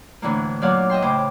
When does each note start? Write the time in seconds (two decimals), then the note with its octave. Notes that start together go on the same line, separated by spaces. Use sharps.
0.22 D2 A2 D3 E3 A#3
0.62 A#2 F#3 C#5 D5 F5 F#5
0.89 D#5 E5 G5 C6
1.02 A2 C#3 C5 D6